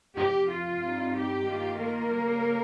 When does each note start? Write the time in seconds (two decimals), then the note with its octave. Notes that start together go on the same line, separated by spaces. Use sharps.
0.16 F2 C3 F3 G4
0.49 F4
0.82 G2 G3 C4 D#4
1.15 G4
1.47 D#3 A#3 F4
1.80 A#3 A#4
2.14 C#3 G3 C#4